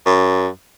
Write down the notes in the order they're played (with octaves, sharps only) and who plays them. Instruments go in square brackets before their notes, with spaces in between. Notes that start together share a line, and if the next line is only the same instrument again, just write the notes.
[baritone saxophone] F#2